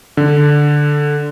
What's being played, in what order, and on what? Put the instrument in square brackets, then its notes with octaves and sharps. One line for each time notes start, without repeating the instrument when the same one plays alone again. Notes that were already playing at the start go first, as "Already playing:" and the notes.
[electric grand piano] D3